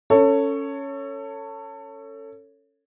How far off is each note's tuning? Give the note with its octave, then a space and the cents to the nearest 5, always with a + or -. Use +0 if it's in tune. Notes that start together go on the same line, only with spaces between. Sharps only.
C#4 +0 A4 +25 C#5 +0